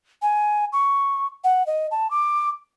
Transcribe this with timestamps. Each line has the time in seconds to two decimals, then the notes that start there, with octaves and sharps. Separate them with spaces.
0.22 G#5
0.73 C#6
1.44 F#5
1.67 D#5
1.91 A5
2.11 D6